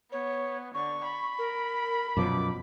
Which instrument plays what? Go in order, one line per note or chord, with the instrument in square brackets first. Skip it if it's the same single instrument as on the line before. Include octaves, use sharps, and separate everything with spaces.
[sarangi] B3 [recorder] C#5
[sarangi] D3 [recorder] C#6
[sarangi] B5
[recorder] A#4
[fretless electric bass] F#2 B2 F3 [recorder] D6